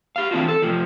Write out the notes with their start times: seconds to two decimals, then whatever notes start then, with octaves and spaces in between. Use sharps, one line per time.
0.16 G4 F5
0.31 E3 C4 D4 F4 F#4
0.48 A4
0.62 F2 C3 F3